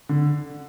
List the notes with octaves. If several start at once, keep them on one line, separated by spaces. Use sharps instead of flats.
D3